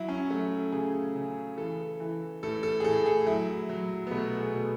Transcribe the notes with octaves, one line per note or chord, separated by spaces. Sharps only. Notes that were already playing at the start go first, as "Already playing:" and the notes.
Already playing: F#3 E4
C#4
F#3 A3
C#3 G#4
C#3
E3 A4
E3
A2 A4
A4
G#4
A2 A4
G#4
F#3 E4
F#3
B3
B2 A3
G#4
B2